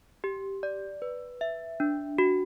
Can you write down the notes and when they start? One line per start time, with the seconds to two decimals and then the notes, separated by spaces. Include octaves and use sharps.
0.24 G4
0.63 D5
1.02 B4
1.41 E5
1.80 D4
2.18 F#4